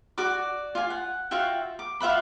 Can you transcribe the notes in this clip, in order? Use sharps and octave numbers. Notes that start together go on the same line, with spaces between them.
F#4 D5 D6
F4 G#5
F#5
F4 F#4 E5 G5
D6
F4 E5 F#5 B5